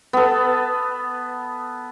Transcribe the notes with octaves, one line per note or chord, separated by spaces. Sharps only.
B3 A4